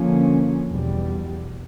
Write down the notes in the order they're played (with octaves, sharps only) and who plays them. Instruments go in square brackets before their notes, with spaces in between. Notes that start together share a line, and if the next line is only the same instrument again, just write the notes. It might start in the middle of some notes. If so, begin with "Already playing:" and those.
Already playing: [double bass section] D3 F3 A#3 C#4
E2 B2 G3